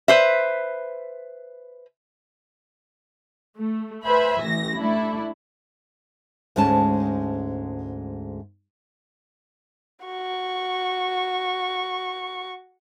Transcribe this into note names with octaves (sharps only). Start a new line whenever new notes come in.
B4 C5 E5
A3
B4 C5 E5 G#5 B5
A1 E3 A#6
A3 D4 E4
D2 G#2 G#3 C#4 A5
F#4 C#6